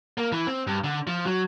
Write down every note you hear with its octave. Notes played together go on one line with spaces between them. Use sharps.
A#3
E3
C4
G2
D3
F3
F#3